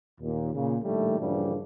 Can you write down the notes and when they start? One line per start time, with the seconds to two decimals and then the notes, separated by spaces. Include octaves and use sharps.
0.21 D#2 A#2
0.54 A#2 C#3
0.83 A#1 A2 D#3 G3 A3
1.19 G2 A#2 C#3 E3 F3 G3